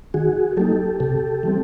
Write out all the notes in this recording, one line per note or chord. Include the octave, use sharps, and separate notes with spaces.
D#3 F#4 G#4
F#3 A#3 D#4 G4 A4
C3 G4 A4
E3 G3 C4